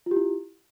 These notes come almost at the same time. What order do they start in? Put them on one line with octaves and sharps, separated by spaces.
F4 G4 E4